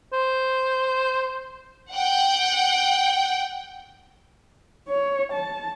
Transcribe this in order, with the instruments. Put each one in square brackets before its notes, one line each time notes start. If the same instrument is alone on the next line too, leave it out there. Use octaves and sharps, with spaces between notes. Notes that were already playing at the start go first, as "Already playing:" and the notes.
[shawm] C5
[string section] F#5 G5
[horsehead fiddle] C#5
A5